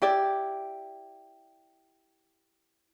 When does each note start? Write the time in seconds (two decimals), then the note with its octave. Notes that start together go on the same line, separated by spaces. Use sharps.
0.02 E4 G4 D5